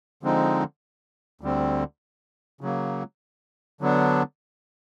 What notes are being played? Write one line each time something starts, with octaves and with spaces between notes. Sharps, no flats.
D3 F3 G#3 C4 D#4
D2 D3 G3 C4
C#3 F#3 A#3
D3 F#3 B3 D4